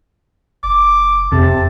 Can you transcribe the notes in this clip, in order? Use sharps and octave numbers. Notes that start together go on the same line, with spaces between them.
F#1 D6
F2 C3 A5